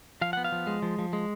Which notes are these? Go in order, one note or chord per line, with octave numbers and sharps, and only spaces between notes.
F3 F5
B3 F#5
F5
F3
G#3
F3
F3
G#3